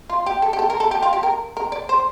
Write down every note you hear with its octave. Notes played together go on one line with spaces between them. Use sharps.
F4
G4
A4
G4
A4
A#4
A4
G4
F4
G4
A#4
A#4
D5
C5